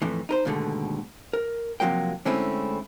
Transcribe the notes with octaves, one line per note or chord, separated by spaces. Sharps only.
F2 A2 E3
D#4 A#4 C5
D#2 G#2 B2 D3 A3
A#4
C3 F3 F#3 A#3 G5
D3 G#3 A3 C4 C#4 E4